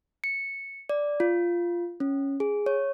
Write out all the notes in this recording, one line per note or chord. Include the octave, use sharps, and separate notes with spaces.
C#7
D5
F4
C#4
G#4
C#5